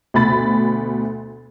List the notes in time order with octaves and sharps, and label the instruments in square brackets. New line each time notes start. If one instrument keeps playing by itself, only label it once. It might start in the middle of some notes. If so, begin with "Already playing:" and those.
[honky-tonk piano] D2 B2 B5 A6